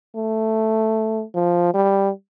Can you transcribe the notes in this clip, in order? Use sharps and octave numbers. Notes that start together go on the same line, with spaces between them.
A3
F3
G3